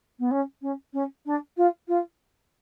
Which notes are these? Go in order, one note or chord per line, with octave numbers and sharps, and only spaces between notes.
B3
C#4
C#4
C#4
D4
F4
F4